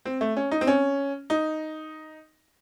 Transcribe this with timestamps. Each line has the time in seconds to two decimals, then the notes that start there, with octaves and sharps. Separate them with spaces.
0.05 C4
0.21 A3
0.37 C#4
0.51 D#4
0.61 C4
0.67 C#4
1.30 D#4